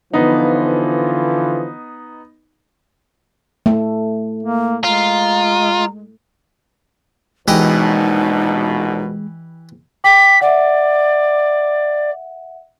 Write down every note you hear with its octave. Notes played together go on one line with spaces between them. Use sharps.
D3 E3 F3 B3 D#4
A3
A#3
G#3 F4 A#5
A#1 B2 E3 G#3 D#4 G4 D#5
G5 D6 B6
D5 E5 F#5